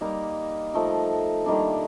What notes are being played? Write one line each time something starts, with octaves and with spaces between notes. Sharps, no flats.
G3 A#3 D#4 A#4
F3 A3 D#4 A#4
D#3 G3 A#3 D4